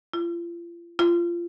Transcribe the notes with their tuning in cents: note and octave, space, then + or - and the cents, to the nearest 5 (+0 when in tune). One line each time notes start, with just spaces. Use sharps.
F4 -35
F4 -20